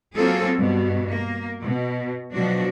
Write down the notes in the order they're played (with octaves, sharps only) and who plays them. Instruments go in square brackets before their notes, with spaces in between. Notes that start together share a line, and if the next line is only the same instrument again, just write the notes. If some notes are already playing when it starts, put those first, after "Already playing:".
[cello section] F#3 A#3 C4 F4 G#4 A4
G2 B2
A#3
B2
B2 F3 F#3 D4 F#4